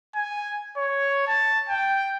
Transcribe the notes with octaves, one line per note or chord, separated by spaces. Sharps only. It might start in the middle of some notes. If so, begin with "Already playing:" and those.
G#5
C#5
A5
G5